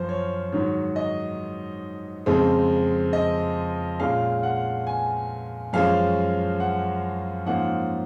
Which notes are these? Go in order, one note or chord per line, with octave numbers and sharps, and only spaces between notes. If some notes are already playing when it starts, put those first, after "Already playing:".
Already playing: F#2 F3 C5
C#5
G#2 D#3 F#3 C#5
D#5
F2 C#3 G#3 C4
D#5
A#2 G#3 C#4 F5
F#5
G#5
F#2 F3 G#3 C#4 F5
F#5
G#2 F3 A#3 C#4 F#5